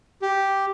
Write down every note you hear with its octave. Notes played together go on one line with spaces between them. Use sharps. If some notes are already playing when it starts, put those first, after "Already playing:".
G4